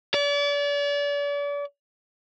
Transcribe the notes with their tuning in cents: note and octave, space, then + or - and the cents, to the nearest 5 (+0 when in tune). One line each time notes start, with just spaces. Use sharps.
D5 -40